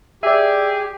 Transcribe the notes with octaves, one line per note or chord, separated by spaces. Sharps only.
G4 G#4 D5 E5